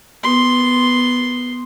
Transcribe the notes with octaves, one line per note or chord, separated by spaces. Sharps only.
B3 C6